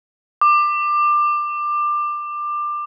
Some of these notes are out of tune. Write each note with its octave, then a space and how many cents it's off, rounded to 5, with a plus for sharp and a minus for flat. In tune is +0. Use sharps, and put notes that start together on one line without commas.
D6 +20